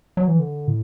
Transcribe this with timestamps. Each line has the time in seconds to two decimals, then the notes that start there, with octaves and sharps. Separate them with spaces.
0.17 F#3
0.28 E3
0.39 D3
0.68 A2